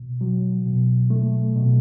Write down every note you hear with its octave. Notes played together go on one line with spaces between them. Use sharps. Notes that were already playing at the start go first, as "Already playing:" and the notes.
Already playing: B2
F#3
B2
A3
B2